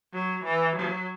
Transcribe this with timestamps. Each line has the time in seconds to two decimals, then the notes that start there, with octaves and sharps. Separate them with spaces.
0.13 F#3
0.44 E3
0.76 F#3